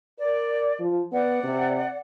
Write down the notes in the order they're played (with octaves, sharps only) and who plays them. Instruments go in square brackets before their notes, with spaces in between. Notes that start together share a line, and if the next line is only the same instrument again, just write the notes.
[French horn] A#4 [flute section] D5
[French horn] F3
[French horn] B3 [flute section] D5 F#5
[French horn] C3